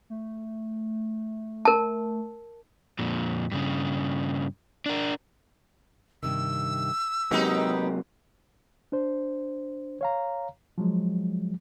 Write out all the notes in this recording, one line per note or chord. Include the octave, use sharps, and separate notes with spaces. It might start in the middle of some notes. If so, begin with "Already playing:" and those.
A3
A#4 A5
F2 A#2
G2 C#3
D4 A#4
G2 C3 D#3 E6
C3 F#3 G#3 A#3 B3 D#4 G4
D4 C5
C#5 F5 A#5
F3 F#3 G#3